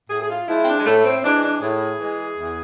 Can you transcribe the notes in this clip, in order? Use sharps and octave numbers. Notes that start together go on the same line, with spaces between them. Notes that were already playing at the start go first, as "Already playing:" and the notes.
A2 G#4
G#4
F4
F3 G#3 E4
C4
D4
G#3
A2 A3
C4
E3 G#3 D4
D4
A2 G#4
E3 G#3
E2